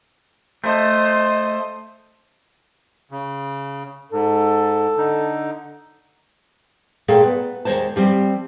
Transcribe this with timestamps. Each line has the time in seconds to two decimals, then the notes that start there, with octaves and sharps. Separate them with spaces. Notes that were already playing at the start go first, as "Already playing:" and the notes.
0.64 A3 C5 D#5
3.11 C#3
4.12 G#2 A4
4.97 D3 D#4
7.08 A#2 A3 G#4 A4 F5 G5
7.24 B3
7.65 D#2 D#3 G#3 C5 A5
7.96 F3 G3 C4